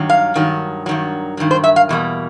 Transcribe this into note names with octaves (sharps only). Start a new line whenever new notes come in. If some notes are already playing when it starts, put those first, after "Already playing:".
Already playing: G2 D#3 F#3
F5
G2 D#3 F#3
G2 D#3 F#3
G2 D#3 F#3
C5
E5
F5
E2 B2 G3 A#3